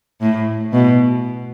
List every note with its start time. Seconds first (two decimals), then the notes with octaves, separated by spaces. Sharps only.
0.21 A2
0.73 B2